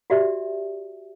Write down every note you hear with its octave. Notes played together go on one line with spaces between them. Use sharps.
F#4 G4 D5 E5